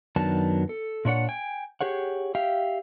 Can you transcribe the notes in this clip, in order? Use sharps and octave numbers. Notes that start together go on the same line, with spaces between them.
F#2 D#3 F#3 B3 D4 A5
A4
A#2 D4 C#5 F#5
G5 G#5
G4 G#4 C#5 F#5
G4 E5 F5 G5